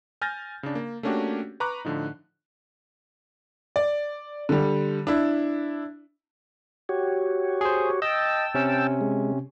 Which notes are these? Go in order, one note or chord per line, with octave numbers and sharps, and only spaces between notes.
G#5 F6 G6 A6 A#6
C#3 D4
A#3
A3 A#3 C#4 D4 F#4 G4
B4 A#5 C#6 D6 F#6
A2 D3 F3 D#4
D5
D3 G3
D4 E4
F#4 G4 C#5
G#4 C5
D#5 G5 A5 E6
C3 C#4
G#3